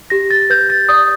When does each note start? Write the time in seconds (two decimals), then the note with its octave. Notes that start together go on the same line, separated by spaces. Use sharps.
0.10 G4 A#6
0.31 A6
0.50 B4 G6
0.70 A6
0.89 D5 D#6